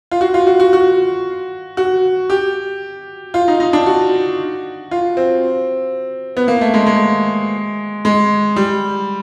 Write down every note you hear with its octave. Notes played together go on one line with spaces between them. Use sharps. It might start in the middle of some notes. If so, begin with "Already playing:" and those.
F4
F#4
F4
F#4
F#4
F#4
F#4
G4
F4
D#4
D#4
D4
F#4
F4
C4
B3
A#3
A3
G#3
G#3
G#3
G3